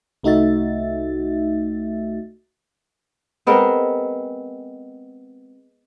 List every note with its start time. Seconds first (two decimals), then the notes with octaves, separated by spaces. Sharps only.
0.23 C2 A3 D#4 F#4 E5 A6
3.47 G#3 B3 C4 A#4